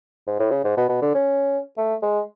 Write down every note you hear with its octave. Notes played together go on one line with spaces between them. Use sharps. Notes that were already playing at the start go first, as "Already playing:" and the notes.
G#2
A2
C#3
G#2
B2
B2
D3
C#4
A3
G#3